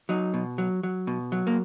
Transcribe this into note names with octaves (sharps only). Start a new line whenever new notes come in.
F#3 D#4
B2
F#3
F#3
B2
F#3
A#3